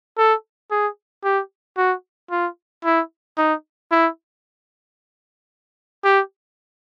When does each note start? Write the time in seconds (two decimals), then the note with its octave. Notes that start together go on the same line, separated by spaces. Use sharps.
0.18 A4
0.71 G#4
1.24 G4
1.77 F#4
2.31 F4
2.84 E4
3.38 D#4
3.92 E4
6.04 G4